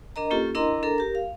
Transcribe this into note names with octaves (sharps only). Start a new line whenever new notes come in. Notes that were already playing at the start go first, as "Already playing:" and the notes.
D4 A#4 D#5 A#5
A#3 C#4 F4 G4 A4
D4 E4 A#4 D#5 A#5 C6
D4 A4 A#4 A#5
G4 A#4
F5